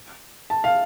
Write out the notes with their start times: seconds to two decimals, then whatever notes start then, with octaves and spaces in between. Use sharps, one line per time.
0.50 A5
0.64 F5